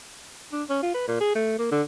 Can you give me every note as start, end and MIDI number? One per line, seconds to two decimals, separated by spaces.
0.52 0.63 62
0.69 0.79 61
0.83 0.91 65
0.94 1.06 71
1.08 1.18 46
1.20 1.32 68
1.35 1.56 57
1.59 1.67 58
1.71 1.82 50